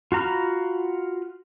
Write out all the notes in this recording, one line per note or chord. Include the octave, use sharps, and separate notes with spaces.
F4 F#4 A#5 B5 F6